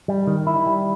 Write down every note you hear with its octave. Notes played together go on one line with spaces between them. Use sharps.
G3
D#3
E4
G3